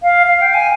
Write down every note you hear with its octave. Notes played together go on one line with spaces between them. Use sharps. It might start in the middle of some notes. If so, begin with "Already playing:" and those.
F5
F5
G5
G#5